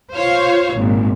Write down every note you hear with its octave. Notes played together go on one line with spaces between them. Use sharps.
F4 C5 C#5 F5
G#1 A#2